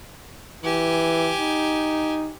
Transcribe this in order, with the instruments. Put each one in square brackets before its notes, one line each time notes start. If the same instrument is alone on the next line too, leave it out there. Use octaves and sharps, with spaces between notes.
[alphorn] E3 [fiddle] G4 G#5
[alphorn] D#4